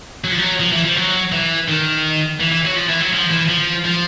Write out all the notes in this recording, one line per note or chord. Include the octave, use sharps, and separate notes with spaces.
F#3
F3
F#3
F3
E3
F3
F#3
E3
D#3
E3
E3
F#3
F3
E3
F#3
F3
E3
F3
F3